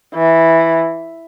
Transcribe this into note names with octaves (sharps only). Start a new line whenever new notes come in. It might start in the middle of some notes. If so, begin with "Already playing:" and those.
E3